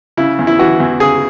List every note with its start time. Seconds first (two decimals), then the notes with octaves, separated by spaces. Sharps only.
0.17 C#3 E4
0.39 E2
0.47 E4
0.59 E3 F#4
0.80 E2
1.00 C#3 G#4